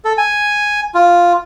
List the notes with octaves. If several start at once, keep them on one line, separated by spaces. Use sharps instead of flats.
A4
G#5
F4